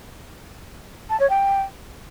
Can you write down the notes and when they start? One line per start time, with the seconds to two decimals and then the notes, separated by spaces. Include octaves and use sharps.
1.10 A5
1.20 C#5
1.30 G5